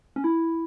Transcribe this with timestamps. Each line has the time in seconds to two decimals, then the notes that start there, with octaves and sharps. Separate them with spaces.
0.16 C#4
0.24 E4